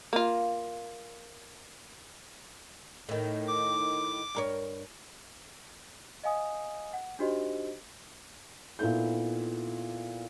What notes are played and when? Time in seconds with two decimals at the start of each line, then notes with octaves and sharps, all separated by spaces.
0.13 A#3 F4
3.09 A2 D#3
3.48 D6
4.35 G2 A#4 C#5
6.24 D#5 F5 G#5 D#6
6.93 F#5
7.19 D4 D#4 F#4 G4 C5 D#5
8.79 A#2 B3 D#4 E4 A4 G6